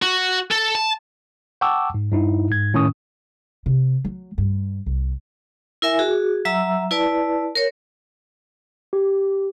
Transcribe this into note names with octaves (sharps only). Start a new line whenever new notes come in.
F#4
A4
A5
F#5 G5 A5 C#6 D6 E6
G#2
G2 D#4 E4
G#2 G#6
A2 D#3 C#4 C#6 D#6
C3
F#3
G2
C2
E4 A#4 E5 G#5
F#4 G#4
F#3 E5 A#5 E6
E4 B4 D5 A5
A#4 C#5
G4